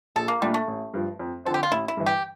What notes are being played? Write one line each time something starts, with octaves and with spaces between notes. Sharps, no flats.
A#1 A4
A#3
A#2 G3 A3 D4 F4
A3
A1
G2 F3
F2
D3 F3 C4 A4
G4
F4
A1 E4
E4
G2 E3
G4